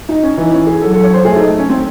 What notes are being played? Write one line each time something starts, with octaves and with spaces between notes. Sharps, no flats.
D#4
C#4
E3 D#4
C#4
G#4
F#3 A4
A4
C#5
C5
A3 G#4
D#4
C#4
C4